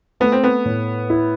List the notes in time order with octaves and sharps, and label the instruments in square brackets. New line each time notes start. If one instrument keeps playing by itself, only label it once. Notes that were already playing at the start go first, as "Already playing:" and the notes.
[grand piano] A3 [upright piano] B3
[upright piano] C4
B3
[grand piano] A2
E4